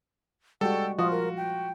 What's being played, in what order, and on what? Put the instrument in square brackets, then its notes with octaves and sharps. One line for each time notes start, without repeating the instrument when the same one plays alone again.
[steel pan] G3 G#3 F#4 [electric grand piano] A4 [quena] G5
[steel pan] F3 F4 [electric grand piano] F#4 [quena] D#6
[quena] A#4
G5